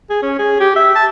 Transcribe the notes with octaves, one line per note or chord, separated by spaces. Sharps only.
G#4
C#4
G#4
G4
E5
A5